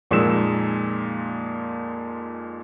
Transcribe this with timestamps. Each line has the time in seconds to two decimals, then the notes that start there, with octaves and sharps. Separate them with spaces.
0.11 F2 A#2 G#3 D#4 E6 E7